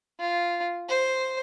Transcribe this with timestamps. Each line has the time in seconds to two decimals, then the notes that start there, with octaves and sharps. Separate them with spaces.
0.20 F4
0.89 C5